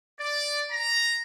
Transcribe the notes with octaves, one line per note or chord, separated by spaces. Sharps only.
D5
A#5